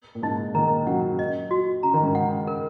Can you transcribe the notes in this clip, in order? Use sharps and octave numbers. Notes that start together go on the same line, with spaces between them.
A#2
G#2 C#3 D#4
A#2 D#3 A#5
C#3 F#3 F#5
D#5
F#4
C#3 A#5
D#3
G#2 C#3
F#5
A#4